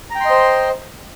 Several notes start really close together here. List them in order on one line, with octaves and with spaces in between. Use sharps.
A#5 G5 C6 D#5 C5